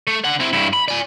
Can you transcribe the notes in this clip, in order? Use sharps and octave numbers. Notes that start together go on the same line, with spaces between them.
A3
D3 F#5
C4 E4
G2 E4
B5
D5 G#5